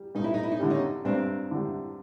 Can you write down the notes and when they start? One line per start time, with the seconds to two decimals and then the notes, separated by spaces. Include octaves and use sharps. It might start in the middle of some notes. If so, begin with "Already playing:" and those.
Already playing: G3
0.15 G2 D#4
0.24 E4
0.34 D#4
0.43 E4
0.52 D#4
0.60 D3 G3 E4
0.70 C#4 D#4
1.05 G2 C4 D4
1.51 D3 G3